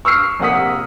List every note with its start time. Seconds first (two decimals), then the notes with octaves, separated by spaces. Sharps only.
0.05 C#6 E6 F6 C7
0.40 A#1 C3 A#3 F#5 D#6 B6